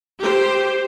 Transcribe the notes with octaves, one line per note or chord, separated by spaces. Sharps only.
G4 C5